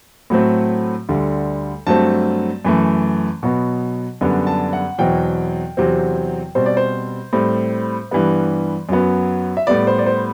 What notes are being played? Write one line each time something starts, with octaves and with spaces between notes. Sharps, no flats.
A2 F#3 A3 C4
D2 D3 G3
G2 F#3 A3 C4 A5
F#2 E3 A3
B2 F#3 B3
F#2 D3 G3 B3
A5
F#5
E2 B2 F#3 C4 G5
E2 C3 F#3 C4
B2 G3 C4 C5
D5
C5
A2 G3 C4
G2 E3 G3 B3
F#2 F#3 B3
E5
A2 G3 B3 D5
C5
D5
C5